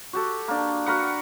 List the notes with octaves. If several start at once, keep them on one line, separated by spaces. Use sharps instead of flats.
F#4 G4 A4
A#3 D4
F#4 A#4 B4 F#5